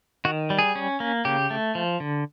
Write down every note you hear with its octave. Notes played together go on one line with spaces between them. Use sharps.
D#3 F#4
G3
G#4
C#4
A#3
C#3 G4
A3
F3
D3